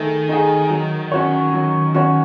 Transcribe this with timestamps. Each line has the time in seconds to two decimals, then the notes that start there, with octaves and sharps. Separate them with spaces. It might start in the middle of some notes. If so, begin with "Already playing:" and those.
Already playing: D#3 A3 D#4 G#4
0.29 D#4 G#4
0.70 F#3
1.12 C#4 F#4 C#5
1.53 F#3
1.94 C#4 F#4 C#5